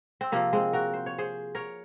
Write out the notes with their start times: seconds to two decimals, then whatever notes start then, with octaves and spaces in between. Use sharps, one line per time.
0.21 C4
0.32 C3 F3 A#3
0.53 G#3 C4
0.73 F#4 A#4
0.93 C5
1.06 C#5
1.18 G#4 C5
1.55 A#4 C#5